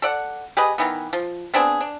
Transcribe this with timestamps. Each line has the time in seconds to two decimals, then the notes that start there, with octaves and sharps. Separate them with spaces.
0.02 A4 D5 F#5
0.57 G4 G#4 B4 D#5
0.78 D#3 E3 B3
1.13 F3
1.54 B3 C4 D4 G#4
1.81 D4